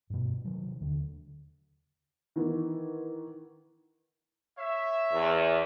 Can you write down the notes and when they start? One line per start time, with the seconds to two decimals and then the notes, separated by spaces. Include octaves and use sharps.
0.10 G2 B2
0.44 C3 D#3 F#3
0.81 D#2 D3
2.36 D#3 E3 B3
4.58 C#5 E5
5.12 E2